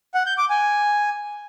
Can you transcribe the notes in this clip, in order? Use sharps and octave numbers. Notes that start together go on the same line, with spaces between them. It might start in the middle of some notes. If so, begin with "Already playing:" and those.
F#5
G6
D6
G#5